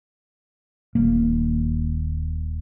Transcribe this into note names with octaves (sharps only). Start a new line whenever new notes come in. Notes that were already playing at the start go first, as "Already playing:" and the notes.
D#1 D#2 A#3